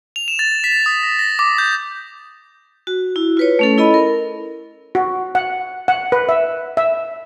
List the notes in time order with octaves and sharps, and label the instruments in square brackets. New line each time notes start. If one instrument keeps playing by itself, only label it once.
[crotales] F7
E7
A6
B6
D#6
A#6
A#6
D6
G6
[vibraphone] F#4
E4
F4 B4 C#5
A3 C#4 A4
E4 A4 D#5 B5
A#4
[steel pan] F#4
F#5
F#5
B4
E5
E5